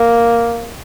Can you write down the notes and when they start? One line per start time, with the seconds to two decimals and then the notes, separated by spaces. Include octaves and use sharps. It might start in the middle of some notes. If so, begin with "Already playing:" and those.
Already playing: A#3